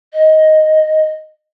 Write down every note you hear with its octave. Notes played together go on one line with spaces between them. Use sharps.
D#5